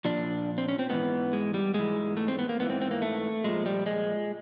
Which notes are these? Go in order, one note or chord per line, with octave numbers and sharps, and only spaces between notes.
A#2 F3 D4
C4
C#4
C4
G#2 E3 B3
G#3
G3
G#2 E3 G#3
A3
C4
B3
A#3
G#2 E3 B3
C4
C4
A#3
A3
A#2 F3 G#3
G3
G#3